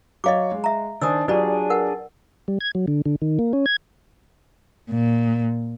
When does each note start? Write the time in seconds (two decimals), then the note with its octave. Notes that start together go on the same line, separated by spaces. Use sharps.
0.24 F#3 C#5 D#5 F5 D6
0.51 G#3
0.64 E5 A#5
1.01 D#3 D4 C5 G#5 D#6 E6
1.28 F#3 D4 F4 G4 G#4 B4 D5
1.70 A#4 B4 F#5
2.48 G3
2.61 G#6
2.75 F#3
2.88 D3
3.06 D3
3.22 D#3
3.39 A#3
3.53 C#4
3.66 G#6
4.90 A#2